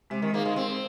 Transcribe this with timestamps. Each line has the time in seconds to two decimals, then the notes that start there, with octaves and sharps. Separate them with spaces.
0.10 C3 G#3
0.22 D#3
0.33 A#3 D#4 G#4 C5 F5
0.46 G#3
0.56 G#3 C4